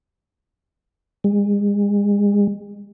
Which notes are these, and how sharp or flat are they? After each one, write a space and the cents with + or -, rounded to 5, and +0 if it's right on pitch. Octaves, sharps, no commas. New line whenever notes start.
G#3 -35